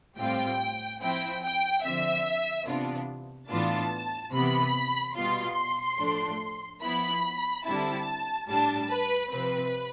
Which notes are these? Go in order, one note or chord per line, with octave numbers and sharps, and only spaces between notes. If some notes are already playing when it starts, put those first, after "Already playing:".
A2 G3 C4 F4 G5
F3 C4 E4 G5
G5
D3 F3 C4 E5
C3 E3 B3 D4 F4
A2 E3 B3 D4 F4 A5
C3 E3 B3 B5
B2 G3 B3 F4 C6
A2 F3 A3 D4
F3 B3 E4 B5
D3 G3 C4 E4 A5
A2 G3 D4 A5
B4
C3 F3 C4 B4